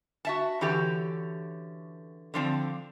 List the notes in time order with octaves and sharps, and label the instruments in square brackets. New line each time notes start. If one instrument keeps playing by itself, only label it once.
[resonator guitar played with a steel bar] F#4 E5 A5
D3 E3 C#4 F#4 G4 A4
D3 F3 C4 D4